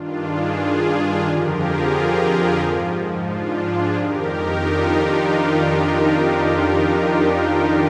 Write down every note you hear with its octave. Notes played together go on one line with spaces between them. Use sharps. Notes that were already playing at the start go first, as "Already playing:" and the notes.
Already playing: G2 D#3 D4 F4
F4 G#4
F2 D3 F3 G4 A#4
F4 G#4
G#2 F3
D4 F4
F4 G#4
F2 D#3 G4 A#4
D#4 G4
D4 F4
D4 F4